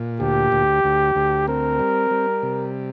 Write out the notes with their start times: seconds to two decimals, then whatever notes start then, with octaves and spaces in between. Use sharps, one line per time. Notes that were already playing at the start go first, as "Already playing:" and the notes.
Already playing: A#2
0.20 D2 G4
0.52 D2
0.84 D2
1.15 D2
1.48 C4 A#4
1.79 G3
2.11 G3
2.43 C3